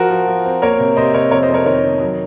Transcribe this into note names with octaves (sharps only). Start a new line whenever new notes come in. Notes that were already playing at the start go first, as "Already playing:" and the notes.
Already playing: F3 F#4 A#4
F3
F3
C4
A#3 A#4 C#5
C3
C3 C5 D#5
C3 A#4 C#5
F2 A#4 C#5
C5 D#5
F2
A#4 C#5
D#3 A#4 C#5
D#3
F#3